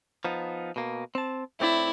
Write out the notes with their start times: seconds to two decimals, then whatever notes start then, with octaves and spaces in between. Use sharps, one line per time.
0.25 F3 B3 D#4
0.76 B2 A#3
1.15 C4 A5
1.60 A2 C4 E4 D5